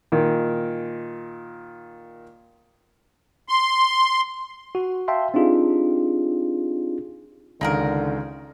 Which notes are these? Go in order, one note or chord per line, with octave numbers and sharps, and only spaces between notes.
A#2 D#3
C6
F#4
E5 F5 G5 A5 C6
C4 D4 D#4 F4 G4 G#4
C#2 D3 D#3 A#3 G#4 A#4